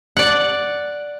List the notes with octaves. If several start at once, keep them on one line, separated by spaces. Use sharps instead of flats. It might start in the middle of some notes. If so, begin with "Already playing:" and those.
D5 F#5